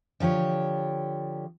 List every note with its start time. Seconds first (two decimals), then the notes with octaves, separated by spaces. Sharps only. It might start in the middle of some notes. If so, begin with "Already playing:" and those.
0.20 D3 F3 G4 C#5